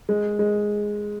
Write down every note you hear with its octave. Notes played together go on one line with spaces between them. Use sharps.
G#3
G#3